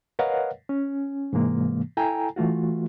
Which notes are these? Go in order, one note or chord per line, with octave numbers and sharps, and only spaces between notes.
A#4 B4 C#5 D#5 F5 F#5
C#4
G#2 C3 E3 G#3 A#3
E4 A4 G5 G#5 A#5
E3 A3 F4 F#4